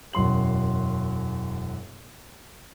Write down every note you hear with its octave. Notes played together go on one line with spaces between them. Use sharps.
E1 F#2 C6 F#7